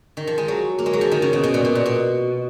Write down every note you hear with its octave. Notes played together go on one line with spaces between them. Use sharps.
D#3
F3
G#3
F#3
A#3
G#3
F#3
F3
D#3
C#3
B2
B2
A#2
B2
A#2
B2